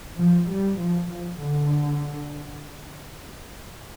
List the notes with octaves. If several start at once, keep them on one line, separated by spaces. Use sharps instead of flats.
F3
G3
F3
F3
D3